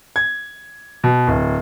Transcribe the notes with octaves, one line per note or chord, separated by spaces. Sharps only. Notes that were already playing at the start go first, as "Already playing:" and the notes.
G#6
B2
D1